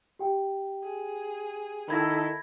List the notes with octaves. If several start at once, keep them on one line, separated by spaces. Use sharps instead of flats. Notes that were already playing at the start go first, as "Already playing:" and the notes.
G4 G5
G#4
D#3 E4 A4 B5 G#6 A#6